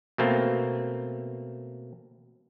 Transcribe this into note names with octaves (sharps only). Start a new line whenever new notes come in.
B2 A3 A#3 C4